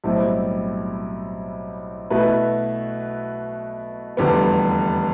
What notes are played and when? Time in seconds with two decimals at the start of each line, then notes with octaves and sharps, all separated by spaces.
0.04 B1 A2 G3 C4 E4
2.10 B2 A3 E4 B4
4.17 F1 E2 D3 G3 B3